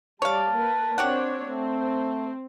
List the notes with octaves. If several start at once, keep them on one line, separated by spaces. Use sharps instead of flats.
G3 C#5 D5 F5 A5
A#3 A#4 B4
C4 D4 F#4 G4 C#5 F#5
A3 C4